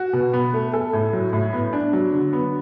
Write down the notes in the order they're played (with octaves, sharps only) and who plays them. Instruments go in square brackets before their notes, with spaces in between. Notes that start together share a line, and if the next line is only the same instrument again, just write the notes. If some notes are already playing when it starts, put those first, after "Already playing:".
Already playing: [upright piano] F#4
B2
B3
A3
A4
A2
F#3
A2
B3
D4
F#3
D3
B3